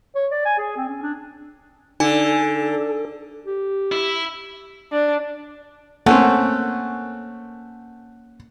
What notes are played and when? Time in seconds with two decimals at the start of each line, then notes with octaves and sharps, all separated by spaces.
0.15 C#5
0.31 D5
0.45 G#5
0.58 G#4
0.77 C4
0.89 C#4
1.02 D4
2.00 D3 D#4 A4 G#5
3.46 G4
3.92 E4
4.92 D4
6.06 A3 A#3 C4 C#4 F#5